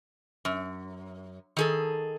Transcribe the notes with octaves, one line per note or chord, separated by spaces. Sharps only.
F#2
D#3 G#4 A4